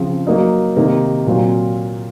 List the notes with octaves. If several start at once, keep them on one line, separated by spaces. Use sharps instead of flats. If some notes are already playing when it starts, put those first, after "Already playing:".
Already playing: C#3 F3 C4
F#3 A#3 D#4
C3 D#3 A#3 D#4
A#2 F#3 C4 F4